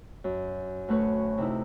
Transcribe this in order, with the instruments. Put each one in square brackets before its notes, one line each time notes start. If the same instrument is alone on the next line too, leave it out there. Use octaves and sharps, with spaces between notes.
[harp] F#2
D2 A3 B4 C#5
C3 D#4 E4